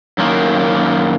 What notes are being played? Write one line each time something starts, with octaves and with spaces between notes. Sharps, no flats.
F#2 D#3 A#3